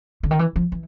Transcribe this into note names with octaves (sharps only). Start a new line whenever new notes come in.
D3
D#3
E3
F3
E3